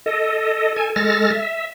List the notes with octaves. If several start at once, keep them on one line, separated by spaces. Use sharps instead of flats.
A4 D#5
A4 G#5
G#3 A4 F6 A6 A#6
E5